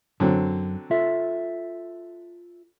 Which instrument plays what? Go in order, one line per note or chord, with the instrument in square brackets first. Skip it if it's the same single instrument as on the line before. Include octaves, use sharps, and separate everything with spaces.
[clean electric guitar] F#2 [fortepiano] D3 F#3 C4
[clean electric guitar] F4 A4 E5